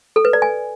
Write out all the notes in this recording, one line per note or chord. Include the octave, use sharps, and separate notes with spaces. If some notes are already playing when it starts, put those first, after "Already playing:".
A4
B4
D5
G#5